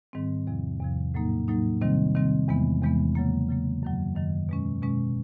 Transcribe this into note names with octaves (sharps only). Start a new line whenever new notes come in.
G#2 D#3 G3 C4
E2 C3 F3
E2 C3 F3
A2 F#3 A#3 D#4
A2 F#3 A#3 D#4
C3 D#3 G3 C4
C3 D#3 G3 C4
E2 C3 E3 G#3 B3
E2 C3 E3 G#3 B3
C#3 F#3 A#3
C#3 F#3 A#3
F#2 D#3 F#3
F#2 D#3 F#3
B2 G#3 C#4
B2 G#3 C#4